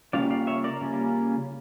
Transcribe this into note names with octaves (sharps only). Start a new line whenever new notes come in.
C#3 G3 A#3 C#4 F4 D5 F5
D5 F5
C#5 E5
A#4 D5
C#3 G3 A#3 C#4 F4